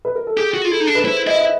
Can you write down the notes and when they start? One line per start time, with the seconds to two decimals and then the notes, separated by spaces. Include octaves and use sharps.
0.05 B4
0.15 A#4
0.27 A4
0.37 G4 G#4
0.54 F#4
0.65 F4
0.71 E4 A4
0.80 D#4
0.87 D4
0.95 B4
1.04 E4 C5
1.27 E4 D#5
1.34 E5
1.41 D#5